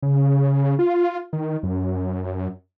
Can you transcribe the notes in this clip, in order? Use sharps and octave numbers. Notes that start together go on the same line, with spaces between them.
C#3
F4
D#3
F#2